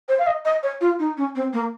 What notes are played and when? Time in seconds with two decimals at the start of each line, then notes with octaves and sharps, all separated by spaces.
0.09 C5
0.19 F5
0.27 D#5
0.45 D#5
0.63 C#5
0.81 F4
0.99 D#4
1.17 C#4
1.35 C4
1.53 A#3